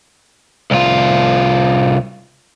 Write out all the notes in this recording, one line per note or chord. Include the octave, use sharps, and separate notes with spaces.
C2 F4